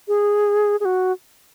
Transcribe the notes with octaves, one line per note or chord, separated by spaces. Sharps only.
G#4
G#4
F#4